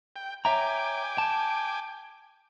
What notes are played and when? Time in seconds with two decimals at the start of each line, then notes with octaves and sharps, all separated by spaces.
0.16 G5
0.45 C#5 E5 G5 G#5 A#5 D6
1.18 A5